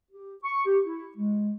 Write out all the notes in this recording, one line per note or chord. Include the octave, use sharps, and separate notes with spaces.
G4
C#6
G4
E4
G#3